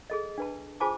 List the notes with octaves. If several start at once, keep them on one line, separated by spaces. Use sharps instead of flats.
G#4 A4 D#5
D4 B4 A5
F4 G#4 C5 G#5 A5 D6